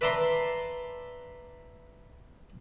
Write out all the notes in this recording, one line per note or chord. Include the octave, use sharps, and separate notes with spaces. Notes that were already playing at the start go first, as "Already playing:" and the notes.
B4 D5 E5 A5 A#5 C6